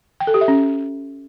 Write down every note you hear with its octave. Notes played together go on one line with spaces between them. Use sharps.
G5
A4
G4
E5
C#4